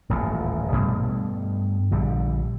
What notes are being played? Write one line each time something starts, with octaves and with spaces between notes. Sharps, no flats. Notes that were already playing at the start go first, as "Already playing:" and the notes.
D#1 A1 D#2 A#2
G2 B2 G3 A3
A#1 D3 G3